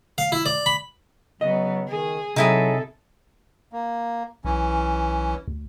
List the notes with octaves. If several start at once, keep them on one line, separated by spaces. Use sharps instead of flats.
F5
E4
D5
B5
C#3 F#3 B3 D#5
D#3 G#4
C3 F#3 D#4 E4 G#4 A4
A#3
B1 E3 C#4
D2